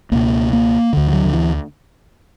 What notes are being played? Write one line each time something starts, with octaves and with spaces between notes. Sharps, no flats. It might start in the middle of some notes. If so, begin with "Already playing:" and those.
C#2 B2 A#3
A#3
D2 D3
E3
F#3
D3
E3